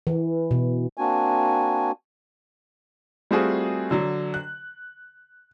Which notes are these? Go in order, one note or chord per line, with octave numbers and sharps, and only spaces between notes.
E3
B2
A#3 C4 D4 F#4 G#5
G3 A3 C4 F4 F#4 G#4
D3 F#3
F#6